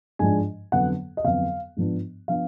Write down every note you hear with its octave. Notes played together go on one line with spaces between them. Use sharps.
G#2 F3 G#3 D4 G#5
F2 D3 F#3 B3 F#5
D#5
F2 D3 F#3 B3 F5
G#2 F3 B3 D4
F3 B3 D4 F5